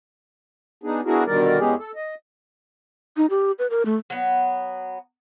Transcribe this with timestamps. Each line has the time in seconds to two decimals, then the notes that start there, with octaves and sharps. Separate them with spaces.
0.83 B3 D4 D#4 G#4
1.05 B3 D4 E4 F#4 G#4 A#4
1.26 B2 D3 D#3 G3 A#4 D5
1.59 E2 G#3 B3 C#4 G4 G#4
1.78 A4
1.96 D#5
3.17 D#4
3.30 G4
3.59 B4
3.70 A#4
3.85 A3
4.10 F#3 B3